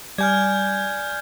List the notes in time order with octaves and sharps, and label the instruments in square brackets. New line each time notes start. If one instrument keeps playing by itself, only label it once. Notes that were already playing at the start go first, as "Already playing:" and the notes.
[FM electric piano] G3 [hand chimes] D5 G#5 [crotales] F6 G6 G#6